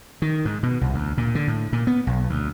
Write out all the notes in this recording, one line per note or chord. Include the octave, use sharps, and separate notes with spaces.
D#3
G#2
B2
C2
D2
A#2
D3
A2
A#2
B3
B1
D2